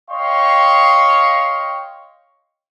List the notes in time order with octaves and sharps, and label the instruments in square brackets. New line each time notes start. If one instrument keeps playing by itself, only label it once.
[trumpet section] C#5 D#5 F5 G5 C6 C#6